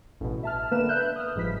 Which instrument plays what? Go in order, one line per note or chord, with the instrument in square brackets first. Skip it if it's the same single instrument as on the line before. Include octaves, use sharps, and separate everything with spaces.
[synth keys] A1 B2
E5 A5 F6
D3 A#3 B3 B4 E7
B4 E5 F#6 G6
D#6 F6
G1 G#2 F3 B4 B6